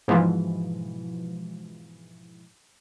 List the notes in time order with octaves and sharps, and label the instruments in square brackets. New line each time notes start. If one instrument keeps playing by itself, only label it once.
[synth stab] G#2 B2 E3 F3